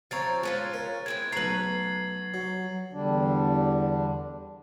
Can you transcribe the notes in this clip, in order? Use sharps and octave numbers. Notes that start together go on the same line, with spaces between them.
F3 C4 C#5 F5 A#5 A6
G#3 C#4 F4
A#4
G#3 C4 E4 G#6
B1 A3 B4 A#5 C7 F#7
F#3
E2 D3 G3 D4